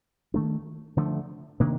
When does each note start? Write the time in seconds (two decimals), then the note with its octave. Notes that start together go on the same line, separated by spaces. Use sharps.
0.34 D#3 A3 D4
0.97 D3 F3 A3
1.60 C3 D#3 A#3 D4